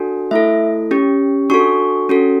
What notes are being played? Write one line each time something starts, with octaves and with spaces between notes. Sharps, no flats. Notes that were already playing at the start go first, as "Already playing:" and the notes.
Already playing: D4 F#4 A4
A3 E4 A4 E5
C#4 G4
D4 F#4 A4 C#6
C#4 F#4 A4